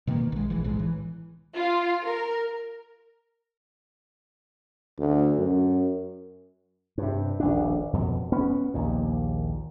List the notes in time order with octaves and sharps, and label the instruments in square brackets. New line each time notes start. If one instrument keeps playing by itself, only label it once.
[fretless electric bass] B2 D#3 F3 A#3
A#1 G#3
F1 A#1 E3
B1 A2 G#3
E3
[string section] F4
A#4
[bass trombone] D2
F#2
[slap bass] G2 C3
D#1 A#1 D4
F2 B2
B3 C#4
A#1 D#2 A#2